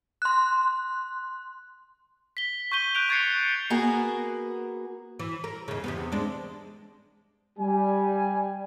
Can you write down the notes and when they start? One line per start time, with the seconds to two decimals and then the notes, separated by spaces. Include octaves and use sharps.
0.22 C6 F#6
2.37 B6 G7
2.72 C#6 G6 D#7 G7
2.95 F#6 G6 D7 F7
3.09 C#6 G#6 A6 C7 C#7
3.70 A#3 B3 F#4 G#4
5.19 E3
5.44 A#4
5.68 D#2 C#3
5.84 E2 C3 B3
6.12 G#3 D4
7.59 G3 G#5